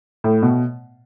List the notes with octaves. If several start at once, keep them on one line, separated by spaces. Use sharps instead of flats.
A2
B2